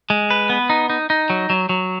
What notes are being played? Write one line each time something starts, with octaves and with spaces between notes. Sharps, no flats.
G#3
B4
B3
D#4
D#4
D#4
F#3
F#3
F#3